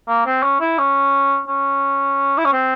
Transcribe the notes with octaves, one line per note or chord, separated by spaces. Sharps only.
A#3
C4
C#4
E4
C#4
C#4
E4
C#4
C4